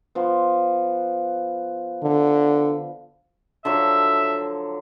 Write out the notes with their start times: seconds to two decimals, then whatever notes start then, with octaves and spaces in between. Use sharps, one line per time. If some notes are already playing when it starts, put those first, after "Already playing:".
0.15 F3 B3
2.03 D3
3.65 D3 F3 F#3 E5